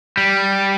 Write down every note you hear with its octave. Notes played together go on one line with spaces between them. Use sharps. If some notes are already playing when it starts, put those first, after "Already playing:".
G3